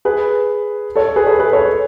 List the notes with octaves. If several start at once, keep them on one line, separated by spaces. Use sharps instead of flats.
G#4 B4
A4 C#5
G#4 B4
A4 C#5
G#4 B4
A4 C#5